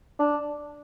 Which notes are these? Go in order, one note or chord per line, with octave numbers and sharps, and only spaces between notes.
D4